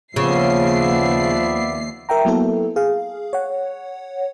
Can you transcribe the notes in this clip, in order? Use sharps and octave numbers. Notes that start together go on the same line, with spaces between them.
D#2 C#3 F3 B3 D5 E5 C7
A#4 E5 G5 A#5
F#3 A#3 B3 E4 A4
G#4 F5
C#5 F#5